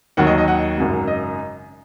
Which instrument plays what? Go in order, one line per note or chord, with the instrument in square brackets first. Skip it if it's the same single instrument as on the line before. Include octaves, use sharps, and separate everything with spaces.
[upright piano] D#2 D#3 F#3 F#5
D#5
D#5
F#5
G#1 F#2 C#3 F#3
D#5